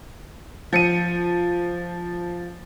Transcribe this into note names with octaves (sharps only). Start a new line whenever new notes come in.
F3 C#7 D#7